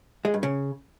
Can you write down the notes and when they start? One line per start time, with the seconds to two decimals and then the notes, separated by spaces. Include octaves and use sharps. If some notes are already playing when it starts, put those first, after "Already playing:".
0.25 G#3
0.34 G2
0.43 C#3